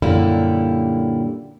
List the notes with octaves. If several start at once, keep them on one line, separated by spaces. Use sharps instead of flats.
F#2 A#2 D3 G3 A#3 E4